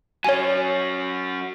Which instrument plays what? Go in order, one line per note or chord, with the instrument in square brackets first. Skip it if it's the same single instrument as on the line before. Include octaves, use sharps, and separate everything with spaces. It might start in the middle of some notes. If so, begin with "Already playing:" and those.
[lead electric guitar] F#3 C#4 [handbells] C#5 G#5